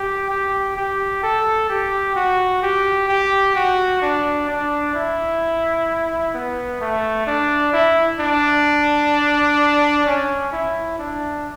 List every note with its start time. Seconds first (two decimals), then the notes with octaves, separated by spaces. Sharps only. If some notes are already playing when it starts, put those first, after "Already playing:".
Already playing: G4
0.30 G4
0.76 G4
1.23 A4
1.69 G4
2.16 F#4
2.62 G4
3.08 G4
3.55 F#4
4.02 D4
4.48 D4
4.95 E4
6.34 B3
6.81 A3
7.27 D4
7.73 E4
8.20 D4
10.06 C#4
10.52 E4
10.99 D4